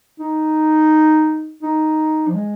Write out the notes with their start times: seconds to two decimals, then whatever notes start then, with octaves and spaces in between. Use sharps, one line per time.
0.19 D#4
1.62 D#4
2.28 F3
2.35 G#3